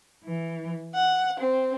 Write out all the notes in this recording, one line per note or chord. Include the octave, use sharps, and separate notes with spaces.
E3
F#5
C4